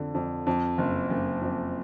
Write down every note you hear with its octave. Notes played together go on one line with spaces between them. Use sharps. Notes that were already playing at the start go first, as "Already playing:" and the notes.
Already playing: F2 D3
F2
F2
F#1
F#1
F2